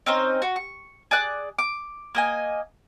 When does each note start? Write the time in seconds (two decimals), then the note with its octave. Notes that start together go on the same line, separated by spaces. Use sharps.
0.06 C4 C#4 D#4 C5
0.42 F#4
0.56 C#6
1.11 G#4 D5 D6 F#6
1.59 D6
2.15 A#3 D#5 G#5